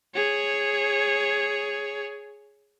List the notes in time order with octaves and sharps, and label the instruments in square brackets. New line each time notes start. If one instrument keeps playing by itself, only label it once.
[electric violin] G#4 C#5